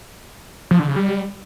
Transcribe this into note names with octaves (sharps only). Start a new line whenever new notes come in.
F3
D3
C#3
G3